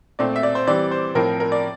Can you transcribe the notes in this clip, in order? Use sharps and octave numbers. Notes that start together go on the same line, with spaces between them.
A#2 A3 C4 D5
E5
D5
C5
E3 G3 C4 D5
C5
A2 F3 C4 A#4
A#4
D5